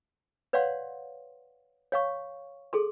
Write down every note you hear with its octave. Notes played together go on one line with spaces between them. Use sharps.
B4 C#5 D5 F5 F#5 C6
C#5 F5 C#6
G#4 A4 C6